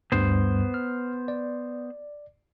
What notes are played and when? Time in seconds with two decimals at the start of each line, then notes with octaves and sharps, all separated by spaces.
0.12 D2 G2 G3 B3 C5
0.74 F6
1.28 D5